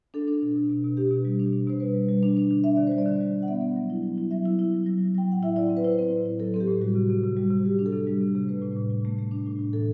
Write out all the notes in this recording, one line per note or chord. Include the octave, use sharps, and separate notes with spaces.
D4 A4
D4
B2
B2
B2
B2
D4 G4
B2
G3
D4
B2
B2 C5
G3 B4
G3
G3
D4
D4
D3
D4 E5
D3 D5
G3 C5
D5
D3
G3
D3
F#5
B3 E5
B3
F#3
E4
F#3
E4
F#3 E5
E4
E4
F#3
F#3
F#3
F#3 G5
A2 F#5
E4 E5
E4 D5
C4
B4
E4 C5
B4
C4
A2
E4
F#3 A4
C4 A4
G4
A2
G3 F#4
C3
C3
C3
G3
C3
G3 G4
D4
A4
C3
G3
C3
C3
A3 B4
A2
A2
A2
A3
A3
D4
A2
A2
E3 A4